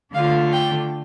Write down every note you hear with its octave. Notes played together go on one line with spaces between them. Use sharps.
D3 A3 D4 F4 F5
G5